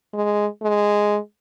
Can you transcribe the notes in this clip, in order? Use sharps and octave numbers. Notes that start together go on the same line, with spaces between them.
G#3
G#3